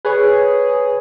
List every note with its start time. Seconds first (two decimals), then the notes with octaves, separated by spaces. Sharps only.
0.05 G#4 B4 C#5